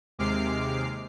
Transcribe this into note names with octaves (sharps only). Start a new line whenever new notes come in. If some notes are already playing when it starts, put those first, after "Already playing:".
D#2 C3 G#3 D6 F6 C7